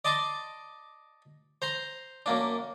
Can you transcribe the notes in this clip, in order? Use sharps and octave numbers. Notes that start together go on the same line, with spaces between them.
D5 D#5 A5 C6 D6
C5 A#5 C6
F#2 A#3 D4